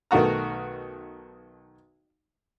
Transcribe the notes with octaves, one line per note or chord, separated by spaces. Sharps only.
B1 D#3 A3 F#4 A#5